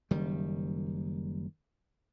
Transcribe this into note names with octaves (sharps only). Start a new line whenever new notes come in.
F#1 D#3 G3